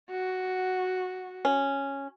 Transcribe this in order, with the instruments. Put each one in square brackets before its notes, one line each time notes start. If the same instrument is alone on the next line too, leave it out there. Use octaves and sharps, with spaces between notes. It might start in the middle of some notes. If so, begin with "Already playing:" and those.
[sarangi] F#4
[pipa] C#4